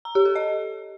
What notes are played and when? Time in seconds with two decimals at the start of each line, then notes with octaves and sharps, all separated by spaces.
0.05 A#5
0.15 G4
0.25 A4
0.35 D#5